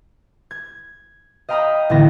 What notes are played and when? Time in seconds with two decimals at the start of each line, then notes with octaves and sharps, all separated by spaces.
0.51 G#6
1.49 D#5 F5 G5 A#5 B5 D#6
1.90 A1 D3 B3 E4 A#6